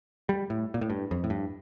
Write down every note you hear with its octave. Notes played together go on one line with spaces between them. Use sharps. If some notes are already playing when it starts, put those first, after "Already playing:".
G3
A2
A#2
A2
G2
F2
A2
G2